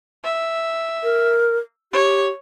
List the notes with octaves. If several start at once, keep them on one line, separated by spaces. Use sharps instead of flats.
E5
A#4
G4 C#5